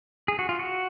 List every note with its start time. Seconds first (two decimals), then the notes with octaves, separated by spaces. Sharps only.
0.28 G#4
0.39 F#4
0.49 F4
0.59 F#4